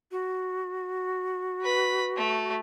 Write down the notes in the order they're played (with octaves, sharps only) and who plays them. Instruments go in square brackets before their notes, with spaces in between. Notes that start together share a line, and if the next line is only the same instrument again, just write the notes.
[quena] F#4
[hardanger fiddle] B4 B5
A3